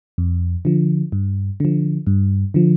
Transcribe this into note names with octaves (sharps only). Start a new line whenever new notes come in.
F2
D3 F3
G2
D3 F3
G2
D3 F3